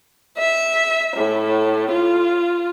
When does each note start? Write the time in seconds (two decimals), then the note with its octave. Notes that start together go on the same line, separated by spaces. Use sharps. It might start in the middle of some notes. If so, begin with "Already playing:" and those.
0.37 E5
1.16 A2
1.91 F4